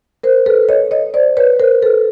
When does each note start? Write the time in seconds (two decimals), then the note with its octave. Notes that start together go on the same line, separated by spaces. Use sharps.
0.23 A#4 C5
0.46 A4 B4
0.69 C#5 D#5
0.91 C#5 D#5
1.14 C5 D5
1.37 B4 C#5
1.59 A#4 C5
1.82 A4 B4